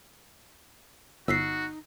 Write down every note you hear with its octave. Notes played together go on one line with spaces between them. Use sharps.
G1 D#4 F#4 E6 B6 C7